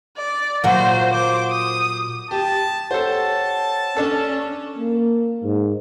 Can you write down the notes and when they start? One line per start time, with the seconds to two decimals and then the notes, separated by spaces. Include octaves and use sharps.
0.17 D5
0.64 A#2 F#3 F#4 C5
1.11 C5 D6
1.50 D#6
2.31 G4 A5
2.91 G4 A4 C5 C#5 F#5 A5
3.97 C#4 D4 A4
4.78 A#3
5.43 G#2